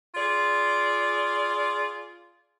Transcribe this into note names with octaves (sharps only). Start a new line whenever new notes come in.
F4 G#4 D5